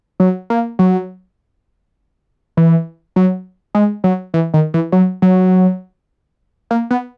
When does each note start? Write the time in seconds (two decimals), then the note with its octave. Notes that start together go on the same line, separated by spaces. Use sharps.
0.20 F#3
0.50 A#3
0.79 F#3
2.57 E3
3.16 F#3
3.75 G#3
4.04 F#3
4.34 E3
4.54 D#3
4.74 E3
4.92 F#3
5.22 F#3
6.71 A#3
6.91 B3